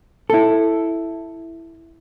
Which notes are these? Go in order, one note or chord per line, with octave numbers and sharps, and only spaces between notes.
E4 A4